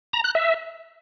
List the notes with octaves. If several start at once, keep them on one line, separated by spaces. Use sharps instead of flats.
A#5
F#6
E5